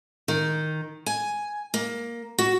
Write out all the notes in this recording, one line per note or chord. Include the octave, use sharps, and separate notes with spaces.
D#3
G#5
A#3
F#4